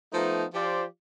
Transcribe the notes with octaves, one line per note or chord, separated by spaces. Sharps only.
F3 A3 B3 D#4
F3 F4 G4 C5 D5